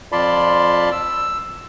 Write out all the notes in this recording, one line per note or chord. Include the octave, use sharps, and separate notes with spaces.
F2 F4 D5 A5 B5 C6
E6